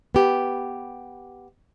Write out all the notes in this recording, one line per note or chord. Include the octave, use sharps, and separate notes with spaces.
B3 G4